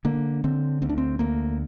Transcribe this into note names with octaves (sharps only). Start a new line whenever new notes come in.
D3 A#3
D3 C4
D2 C4
D4
C4
D2 A#3